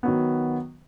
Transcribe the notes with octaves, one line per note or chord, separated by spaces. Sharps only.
D#3 F#3 B3